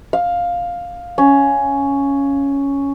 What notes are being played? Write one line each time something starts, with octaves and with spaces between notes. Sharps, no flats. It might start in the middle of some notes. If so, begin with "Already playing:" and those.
F5
C#4